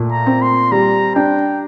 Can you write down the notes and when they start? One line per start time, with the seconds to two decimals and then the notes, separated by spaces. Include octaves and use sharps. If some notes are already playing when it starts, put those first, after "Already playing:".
Already playing: A#2 A3
0.12 A#5
0.26 C4
0.42 C6
0.72 G3 A#5
1.15 D4 G5